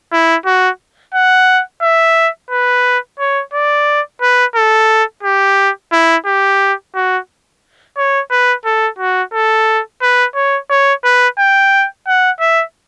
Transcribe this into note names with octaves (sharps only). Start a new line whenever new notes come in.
E4
F#4
F#5
E5
B4
C#5
D5
B4
A4
G4
E4
G4
F#4
C#5
B4
A4
F#4
A4
B4
C#5
C#5
B4
G5
F#5
E5